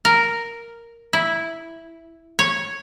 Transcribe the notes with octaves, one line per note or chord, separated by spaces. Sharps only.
A#4
E4
C#5